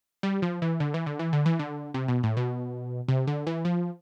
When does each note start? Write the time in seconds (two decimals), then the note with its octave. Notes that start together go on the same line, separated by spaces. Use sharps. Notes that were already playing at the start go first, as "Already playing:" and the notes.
0.23 G3
0.42 F3
0.62 E3
0.80 D3
0.94 E3
1.06 D3
1.19 E3
1.33 D3
1.46 E3
1.59 D3
1.94 C3
2.08 B2
2.23 A2
2.37 B2
3.08 C3
3.27 D3
3.47 E3
3.65 F3